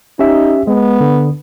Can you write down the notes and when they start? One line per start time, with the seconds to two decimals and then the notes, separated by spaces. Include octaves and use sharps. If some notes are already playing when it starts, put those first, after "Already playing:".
0.19 C#4 D#4 G4 E5
0.67 G#3 B3
1.00 D3